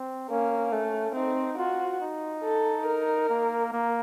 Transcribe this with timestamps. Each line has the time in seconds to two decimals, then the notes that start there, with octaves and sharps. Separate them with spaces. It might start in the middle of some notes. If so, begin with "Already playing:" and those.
Already playing: C4
0.29 A#3 C#4
0.72 A3 C#4
1.15 C4 D#4
1.58 F4 F#4
2.00 D#4
2.43 A4
2.87 A#4
3.30 A#3
3.72 A#3